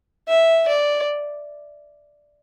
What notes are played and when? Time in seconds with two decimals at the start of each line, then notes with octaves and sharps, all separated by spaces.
0.28 E5
0.67 D5